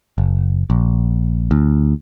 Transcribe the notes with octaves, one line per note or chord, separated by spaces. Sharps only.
F#1
A#1
D2